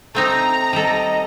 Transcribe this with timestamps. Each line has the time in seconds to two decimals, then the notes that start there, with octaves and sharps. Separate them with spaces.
0.15 A3 C4 D#4 A#5
0.73 G3 A4 D#5